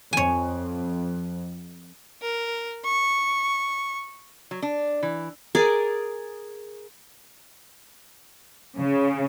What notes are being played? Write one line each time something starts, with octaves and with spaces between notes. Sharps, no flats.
F2 C#5 G#5
A#4
C#6
F#3
D4
E3
G#4 A#4 D5
C#3